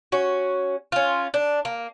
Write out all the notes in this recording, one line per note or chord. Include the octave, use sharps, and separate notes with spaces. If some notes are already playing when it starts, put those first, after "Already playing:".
C#4 F#4
C#4 F4
D4
A#3